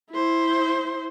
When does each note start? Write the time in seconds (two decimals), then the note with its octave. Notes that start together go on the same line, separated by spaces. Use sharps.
0.11 E4 C5